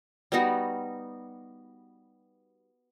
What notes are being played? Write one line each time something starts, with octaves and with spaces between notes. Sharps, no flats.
G3 B3 D#4 F#4